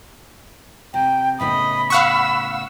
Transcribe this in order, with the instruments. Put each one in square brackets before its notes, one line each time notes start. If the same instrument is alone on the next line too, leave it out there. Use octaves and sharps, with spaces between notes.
[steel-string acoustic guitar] C3 [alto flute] G5
[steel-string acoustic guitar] A2 C#3 B3 [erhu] D#5 [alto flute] B5
[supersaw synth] F5 F#5 C#6 [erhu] E6